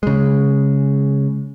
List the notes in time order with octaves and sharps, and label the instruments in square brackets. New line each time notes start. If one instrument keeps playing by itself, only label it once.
[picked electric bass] C#3 G#3